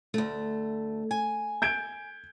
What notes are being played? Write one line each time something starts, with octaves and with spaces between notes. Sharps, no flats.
D2 A3
G#5
G6 G#6 D7